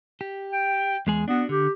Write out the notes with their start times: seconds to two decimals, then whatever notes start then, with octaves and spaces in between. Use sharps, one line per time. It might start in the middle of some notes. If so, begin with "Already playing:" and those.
0.21 G4
0.53 G5
1.07 E2 G#3 G#4
1.28 B3 D4 F#4
1.49 D3 G4